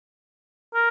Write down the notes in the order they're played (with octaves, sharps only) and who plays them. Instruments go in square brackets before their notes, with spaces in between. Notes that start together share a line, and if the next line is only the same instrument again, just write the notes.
[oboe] A#4